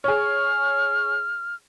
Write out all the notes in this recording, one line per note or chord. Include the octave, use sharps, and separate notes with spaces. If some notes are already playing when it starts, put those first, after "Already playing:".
G#4 C#5 F6